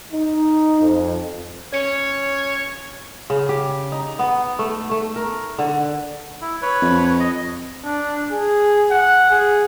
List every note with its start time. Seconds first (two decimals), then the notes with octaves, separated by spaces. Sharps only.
0.13 D#4
0.80 F2
1.73 C#4 C#5
3.30 C#3
3.49 G4
3.92 D#4
4.19 B3
4.59 A3
4.91 A3
5.16 A#4
5.59 D3
6.41 E4
6.62 B4 C#5
6.82 F2
7.20 D#5
7.84 D4
8.32 G#4
8.90 F#5
9.30 G#4